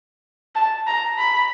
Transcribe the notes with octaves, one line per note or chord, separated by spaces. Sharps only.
A5
A#5
B5